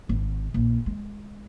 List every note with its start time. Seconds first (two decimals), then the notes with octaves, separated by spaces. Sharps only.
0.09 G#1
0.54 A#1
0.86 G#3